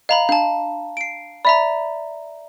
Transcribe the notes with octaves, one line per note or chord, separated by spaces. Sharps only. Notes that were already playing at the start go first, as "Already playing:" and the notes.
D#5 F5 A#5 B5
D4 F5 A5
C7 D7
D5 E5 A#5 B5